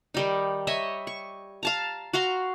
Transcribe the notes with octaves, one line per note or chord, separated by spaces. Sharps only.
D#3 G3 D#4
C#5 D#5 E5
C#6
F5 A5 A#5
F#4 F5 A#5 C6